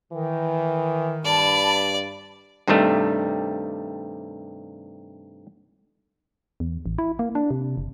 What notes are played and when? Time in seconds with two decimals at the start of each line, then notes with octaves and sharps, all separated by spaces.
0.13 D#3 E3
1.25 G2 D5 A5 B5
2.68 G2 C3 D#3 G3 A3
6.60 E2
6.86 A1
6.98 E4
7.19 A#3
7.35 D4
7.51 C3
7.77 F#1